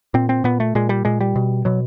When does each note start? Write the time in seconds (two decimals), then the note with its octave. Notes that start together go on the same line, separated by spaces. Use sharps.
0.14 A#2 C4
0.29 C4
0.44 A#2 B3
0.60 A3
0.75 A#2 G#3
0.89 G3
1.05 A#2 G#3
1.21 G3
1.36 B2
1.65 B2 F#3